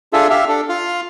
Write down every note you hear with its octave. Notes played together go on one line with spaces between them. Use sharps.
D4 F4 G#4 A4 E5
G4 E5 F5
D4 A4
F4 F5